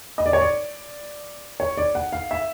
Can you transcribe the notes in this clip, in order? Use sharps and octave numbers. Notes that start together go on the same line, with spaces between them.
D#5
D5
C#5
D5
C#5
D5
F#5
F5
E5